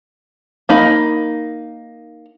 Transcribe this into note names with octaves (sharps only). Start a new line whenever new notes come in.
A#3 D#4 B5